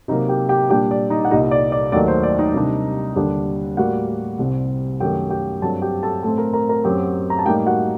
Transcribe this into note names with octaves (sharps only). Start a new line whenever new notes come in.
C3 F#3 A#3 D#4 D#5
G4 G5
G4 G5
A#2 G3 D4 G4 G5
D5
D#4 D#5
F#5
C2 A#2 G3 D#4 D#5
D5
D5
D#2 D#3 F#3 A3 D#4 D5
C5
D5
D#4 D#5
C3 G3 D4
D#2 D3 G3 D4
A2 G3 A#3 F#4 F#5
C2 C3 G3 C4
F#2 D#3 A3 G4 G5
G4 G5
G2 F#3 C4 A4 A5
G4 G5
A4 A5
A2 A3 C4 A4 A5
A#4 A#5
A#4 A#5
A#4 A#5
F#2 F#3 C4 G4 G5
A#5
A5
A2 G3 A#3 D#4 G4 G5
F#4 F#5